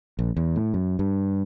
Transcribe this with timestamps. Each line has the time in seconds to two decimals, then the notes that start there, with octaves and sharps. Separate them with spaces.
0.19 A#1
0.37 E2
0.56 A2
0.74 F#2
0.99 G2